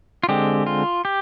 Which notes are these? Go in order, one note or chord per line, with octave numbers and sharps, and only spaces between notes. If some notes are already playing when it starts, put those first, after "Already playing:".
F4
D3 G#3 C4 G4
F4
G4